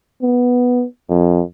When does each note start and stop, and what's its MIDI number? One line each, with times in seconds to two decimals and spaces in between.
0.22 0.84 59
1.09 1.41 41